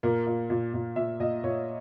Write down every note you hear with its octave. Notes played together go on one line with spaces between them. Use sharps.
A#2 A#4
A#2
A#2
A#2
A#2 E5
A#2 D#5
A#2 C#5